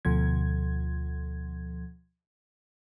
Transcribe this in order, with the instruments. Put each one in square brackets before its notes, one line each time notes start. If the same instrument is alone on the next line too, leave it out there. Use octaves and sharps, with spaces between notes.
[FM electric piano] D2 B2 F3 G#6